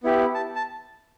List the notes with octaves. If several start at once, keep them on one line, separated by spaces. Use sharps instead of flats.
B3 E4 G4
A5
A5